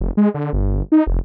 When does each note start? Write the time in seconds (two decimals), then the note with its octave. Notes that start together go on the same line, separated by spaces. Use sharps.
0.01 F1
0.17 G#3
0.34 D3
0.53 G1
0.92 D#4
1.07 F1